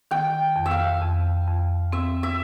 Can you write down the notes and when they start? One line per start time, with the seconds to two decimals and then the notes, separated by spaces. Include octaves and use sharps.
0.11 D#3 G5
0.56 F2
0.66 E5
0.71 F5
1.02 F2
1.48 F2
1.92 C4 E5
2.23 E5